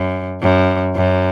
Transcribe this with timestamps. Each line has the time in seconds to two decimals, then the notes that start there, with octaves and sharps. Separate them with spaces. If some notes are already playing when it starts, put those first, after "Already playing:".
Already playing: F#2
0.42 F#2
0.95 F#2